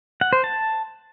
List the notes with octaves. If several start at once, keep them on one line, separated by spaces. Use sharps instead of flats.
F#5
C5
A5